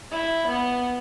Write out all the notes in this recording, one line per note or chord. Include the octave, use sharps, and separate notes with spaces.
E4
B3